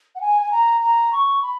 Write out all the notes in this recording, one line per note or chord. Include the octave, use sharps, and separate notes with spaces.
F#5
G#5
G#5
A#5
A#5
C#6
B5